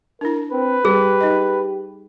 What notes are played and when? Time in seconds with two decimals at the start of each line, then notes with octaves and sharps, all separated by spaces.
0.21 D4 E4 A#4
0.52 C4 B4
0.85 G3 G4 G#4
1.21 D#4 D#5